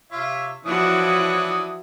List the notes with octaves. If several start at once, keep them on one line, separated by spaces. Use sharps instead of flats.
C3 F4 C#5 E5
E3 F3 D4 E4 F#4 C#5 D#6